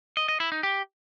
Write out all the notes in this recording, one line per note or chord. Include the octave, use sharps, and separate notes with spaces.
D#5
D#5
E4
D#4
G4